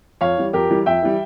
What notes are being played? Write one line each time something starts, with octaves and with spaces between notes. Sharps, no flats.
F2 C#5 F5
E3 G3
F2 G4 A#4
E3 G3
F2 E5 G5
E3 G3